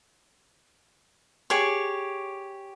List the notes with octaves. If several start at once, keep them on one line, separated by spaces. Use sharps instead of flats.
G4 G#4 C#5